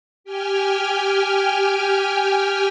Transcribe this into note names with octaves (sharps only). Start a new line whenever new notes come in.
G4 G5 G#5 F6